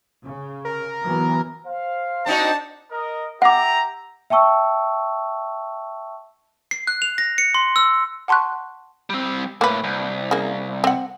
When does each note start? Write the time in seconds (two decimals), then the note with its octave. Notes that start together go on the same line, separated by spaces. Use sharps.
0.24 C#3
0.65 A#4
1.02 E3 F#3 B3
1.65 C5 F5
2.26 C4 D4 D#4 F#4 A5
2.92 A#4 D#5
3.42 G4 E5 F#5 A#5 D6
4.30 E5 G5 A5 C#6 E6
6.71 C7
6.87 F#6
7.02 F7
7.18 A#6
7.38 C#7
7.55 C6
7.76 E6
8.28 F#5 A5 C6 C#6 F#6
9.10 G3 C4
9.61 A2 A#3 B4
9.84 C2
10.31 C#3 A#3
10.84 C4 F#5